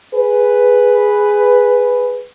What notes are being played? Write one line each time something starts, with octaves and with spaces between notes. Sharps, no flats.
G#4 B4